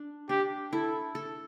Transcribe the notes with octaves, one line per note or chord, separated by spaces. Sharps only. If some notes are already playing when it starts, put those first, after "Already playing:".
Already playing: D4
D4 G4
E4 A4
A4